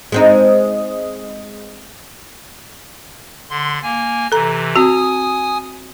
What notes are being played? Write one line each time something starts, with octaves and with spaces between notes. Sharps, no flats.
G#3 C4 D#4
D3 C6
A#3 G#5
C3 E3 A4 A#5
C4 F#4 G#5 D#6